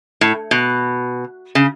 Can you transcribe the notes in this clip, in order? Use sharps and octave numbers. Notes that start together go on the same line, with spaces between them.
A2
B2
C#3